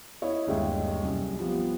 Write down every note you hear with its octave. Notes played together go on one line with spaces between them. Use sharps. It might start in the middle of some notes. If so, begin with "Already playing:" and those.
E4 C#5 D#5
G1 D#2 G#3 E5 G5
C2 F#2
F3 G3 B3